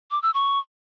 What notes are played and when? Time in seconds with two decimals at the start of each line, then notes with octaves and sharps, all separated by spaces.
0.11 D6
0.22 E6
0.34 C#6